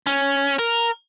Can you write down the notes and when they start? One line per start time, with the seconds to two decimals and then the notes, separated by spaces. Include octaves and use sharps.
0.07 C#4
0.59 A#4